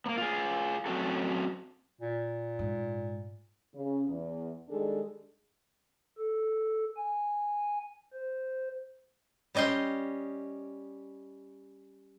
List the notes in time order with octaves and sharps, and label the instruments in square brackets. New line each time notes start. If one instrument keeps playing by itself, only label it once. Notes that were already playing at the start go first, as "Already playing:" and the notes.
[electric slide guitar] A#3 B3
F4 G#4
F#3 A3 C4 C#4 F#4 A4
[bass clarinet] A#2
[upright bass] G#2
[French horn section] C#3
E2
D#3 G3 G#3 D4 G#4 A4
[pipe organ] A4
G#5
C5
[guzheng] G3 C#4 D#5 G5 C6